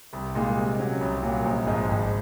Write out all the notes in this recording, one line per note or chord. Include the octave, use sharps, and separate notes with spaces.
C2
A#2 G#3 D#4
C3
F#3 C#4
C2
A#2 F#3
A#1
G#2 F3 G#3 D#4
G#1